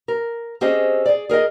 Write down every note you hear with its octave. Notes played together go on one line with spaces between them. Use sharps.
A#4
C4 C#4 G4 G#4 C5 D#5
G#4 D5
G#4 A#4 C#5 D#5